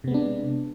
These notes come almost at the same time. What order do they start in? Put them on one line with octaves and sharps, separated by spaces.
C3 B3 G#3 D4